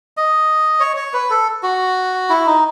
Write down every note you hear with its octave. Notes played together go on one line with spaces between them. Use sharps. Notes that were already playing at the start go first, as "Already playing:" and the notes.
D#5
C#5
C#5
B4
A4
F#4
E4
D#4